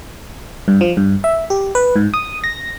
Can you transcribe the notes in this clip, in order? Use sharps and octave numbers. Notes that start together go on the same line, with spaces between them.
G2
F3
G2
E5
G4
B4
G#2
D#6
A#6